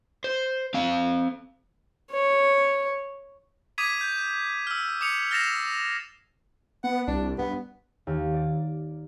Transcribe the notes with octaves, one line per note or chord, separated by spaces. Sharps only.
C5
C4 F5
C#5
D6 D#6 G#6 B6 D#7
G6
E6 F6
D6 D#6 C#7 F7
F6 A6 A#6 C7 E7 F7
B3 F#5
C2 D4
G2 B3
D#2
D5